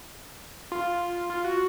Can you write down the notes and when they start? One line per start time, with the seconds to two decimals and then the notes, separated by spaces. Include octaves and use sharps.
0.72 F4
1.30 F4
1.44 F#4